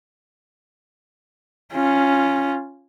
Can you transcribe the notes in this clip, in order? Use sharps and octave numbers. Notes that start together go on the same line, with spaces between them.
C#4 F4